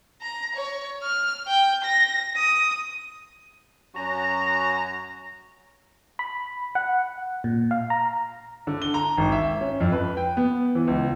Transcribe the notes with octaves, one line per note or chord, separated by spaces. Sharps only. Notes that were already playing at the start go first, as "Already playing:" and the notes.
A#5
C#5
F6
G5
A#6
D#6
F#2 C#4 F#4 A#5
B5
F#5
A#2
F5
A#5
D3
G7
A#5
G#1
E5
C#4
F2
B4
G5
B3
E3
C#2